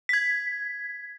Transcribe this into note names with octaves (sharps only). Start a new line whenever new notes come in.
G#6 B6